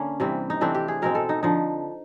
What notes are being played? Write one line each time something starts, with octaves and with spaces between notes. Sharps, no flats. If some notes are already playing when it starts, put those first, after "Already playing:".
Already playing: D3 A#3 C#4
C3 E3 G3 C4
D#4
C3 E3 A3 C4 D4
G4
G#4
B2 G#3 C4 A#4
A4
D#4
D3 F3 D#4